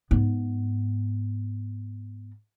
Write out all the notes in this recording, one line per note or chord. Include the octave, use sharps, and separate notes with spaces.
G#2 B3